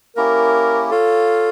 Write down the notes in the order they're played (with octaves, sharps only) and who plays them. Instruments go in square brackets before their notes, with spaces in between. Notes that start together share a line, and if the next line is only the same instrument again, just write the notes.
[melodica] A#3 C#4 E4 G4 [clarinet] A#4
[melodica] F4 C#5 F5 [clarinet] A4